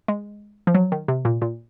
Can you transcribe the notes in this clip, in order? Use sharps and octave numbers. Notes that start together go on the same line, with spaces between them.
G#3
F3
F#3
D#3
C3
A#2
A#2